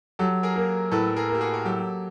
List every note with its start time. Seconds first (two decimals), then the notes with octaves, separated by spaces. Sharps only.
0.19 F#3 G4 A4
0.43 G#4 A#4
0.55 A#3
0.92 A2 A4 B4
1.17 G#4 A#4
1.29 A#3
1.35 G4
1.41 F#4 G#4
1.54 A#4
1.65 F#3 G4 A4